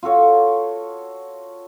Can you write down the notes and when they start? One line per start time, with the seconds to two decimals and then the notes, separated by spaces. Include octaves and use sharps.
0.03 F4 F#4 A4 C#5